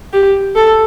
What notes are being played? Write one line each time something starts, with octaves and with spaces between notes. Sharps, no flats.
G4
A4